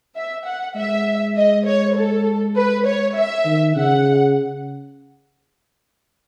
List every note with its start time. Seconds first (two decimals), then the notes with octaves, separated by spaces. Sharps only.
0.15 E5
0.45 F#5
0.75 G#3 E5
1.36 D#5
1.65 C#5
1.95 A4
2.56 B4
2.85 C#5
3.15 E5
3.46 D#3
3.75 C#3 F#5